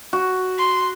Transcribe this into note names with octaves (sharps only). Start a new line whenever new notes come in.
F#4
C6